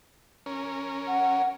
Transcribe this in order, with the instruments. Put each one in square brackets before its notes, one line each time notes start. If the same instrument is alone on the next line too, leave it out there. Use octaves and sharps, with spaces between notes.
[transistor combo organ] C#4 A#4
[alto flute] F#5